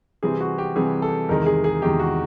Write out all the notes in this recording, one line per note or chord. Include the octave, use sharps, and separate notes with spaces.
C3 E3 G3 C4 G#4
F#4
G4
C3 E3 G3 C4 G#4
A4
E2 C3 D#3 G#3 A#4
G#4
G#4
E2 C3 D#3 G#3 G4
F#4